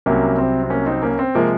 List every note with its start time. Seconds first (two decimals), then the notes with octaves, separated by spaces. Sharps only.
0.06 C2 C3 F#3 A#3 C#4
0.38 C4
0.63 C4
0.70 A#3 C#4
0.86 C4 D#4
1.03 A#3 C#4
1.19 C4
1.35 C3 F3 G#3 A#3